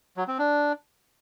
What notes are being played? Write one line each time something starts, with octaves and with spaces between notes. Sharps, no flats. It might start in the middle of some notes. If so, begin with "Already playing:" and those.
F#3
C4
D4